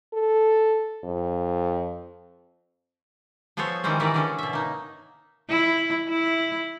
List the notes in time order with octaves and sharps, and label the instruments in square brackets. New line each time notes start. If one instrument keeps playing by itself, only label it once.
[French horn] A4
F2
[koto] F3 B3 G#4 A4 C5 C#5
D#3 E3 G3 G#3 C4 C#4
D#3 E3 E4 A#4 B4 D5
D3 C#4 A4
B2 E5
A#3 D#4
[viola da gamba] E4
E4